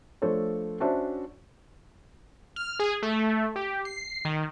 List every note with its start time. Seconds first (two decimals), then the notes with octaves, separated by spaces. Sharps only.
0.22 F3 A3 D4 A4 C5 C#5
0.80 C#4 D4 F#4 C5 E5 A5
2.56 F6
2.79 G#4
3.03 A3
3.56 G4
3.85 C7
4.25 D#3